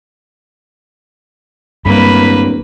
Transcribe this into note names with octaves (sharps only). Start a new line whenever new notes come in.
D1 G2 A#3 B4 B5